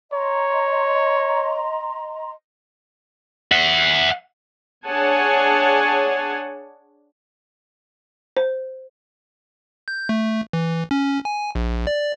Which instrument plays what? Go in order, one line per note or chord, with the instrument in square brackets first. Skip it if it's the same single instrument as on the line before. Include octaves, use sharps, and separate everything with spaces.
[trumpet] C#5 [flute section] D#5 A#5 C6
[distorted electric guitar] E5 F#5
[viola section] D4 G#4 C#5 F#5 G#5 A5
[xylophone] C5
[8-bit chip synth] G6
A3
E3
C#4
G#5
A#1
D5